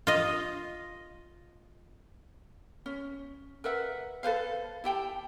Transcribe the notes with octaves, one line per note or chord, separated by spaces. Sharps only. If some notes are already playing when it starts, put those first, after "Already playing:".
F4 D#5
C#4
A#4 B4 E5 F#5
A4 B4 C5 F5
E4 G4 G5 A5